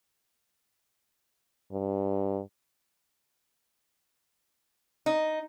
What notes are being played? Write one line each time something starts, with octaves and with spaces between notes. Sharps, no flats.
G2
D#4